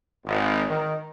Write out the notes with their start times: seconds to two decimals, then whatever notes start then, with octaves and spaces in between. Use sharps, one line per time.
0.25 G#1
0.69 D#3